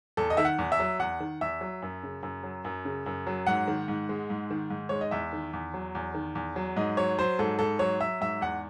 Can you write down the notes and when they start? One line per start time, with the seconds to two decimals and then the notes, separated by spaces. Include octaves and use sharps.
0.17 E2 A4
0.30 D#5
0.37 D#3 E5
0.45 F#5
0.59 E2
0.72 E5
0.80 F#3
0.99 E2 F#5
1.20 D#3
1.41 E2 E5
1.61 F#3
1.82 F#2
2.03 C#3
2.23 F#2
2.43 F#3
2.65 F#2
2.85 C#3
3.06 F#2
3.27 F#3
3.47 G#2 F#5
3.68 D#3
3.88 G#2
4.09 G#3
4.30 G#2
4.50 D#3
4.70 G#2
4.89 G#3 C#5
5.01 D#5
5.11 E2 E5
5.33 D#3
5.53 E2
5.74 F#3
5.95 E2
6.14 D#3
6.35 E2
6.56 F#3
6.76 G#2 D#5
6.97 F#3 C#5
7.18 F#3 C5
7.39 G#2 A4
7.59 G#2 A4
7.79 F#3 C#5
8.01 F#3 E5
8.21 G#2 E5
8.41 E2 F#5